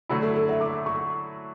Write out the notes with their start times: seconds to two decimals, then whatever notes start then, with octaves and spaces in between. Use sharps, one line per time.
0.09 D3 F#3 A3 E4
0.22 A4
0.36 A4
0.49 E5
0.61 D6
0.86 C#6